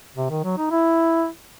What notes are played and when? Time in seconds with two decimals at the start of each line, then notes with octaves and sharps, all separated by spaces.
0.16 C3
0.30 D#3
0.44 F#3
0.57 D#4
0.71 E4